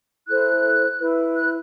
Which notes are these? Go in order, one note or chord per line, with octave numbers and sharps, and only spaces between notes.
E4 A4 C5 F#6
E4 B4
F#6